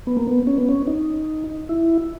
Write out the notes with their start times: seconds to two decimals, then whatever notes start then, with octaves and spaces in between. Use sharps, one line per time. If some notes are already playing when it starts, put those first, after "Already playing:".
0.07 B3
0.17 A#3
0.27 B3
0.47 C#4
0.58 B3
0.69 C#4
0.87 D#4
1.69 E4